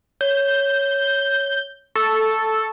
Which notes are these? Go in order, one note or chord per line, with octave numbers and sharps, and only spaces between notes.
C#5 G6
A4 C#6